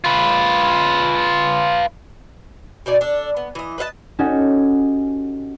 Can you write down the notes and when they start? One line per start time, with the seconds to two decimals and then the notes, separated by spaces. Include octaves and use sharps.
0.04 F4 B4
2.86 B2 D#4 D5 G#5
3.01 D4 A4
3.37 B3
3.55 E3 D#5
3.78 B4 D#5 F5 A5
4.19 C#4 D#4 F#4 G4 A4 G#5